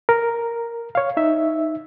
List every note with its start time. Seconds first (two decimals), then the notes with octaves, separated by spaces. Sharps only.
0.09 A#4
0.95 C#5 F5
1.17 D#4 E5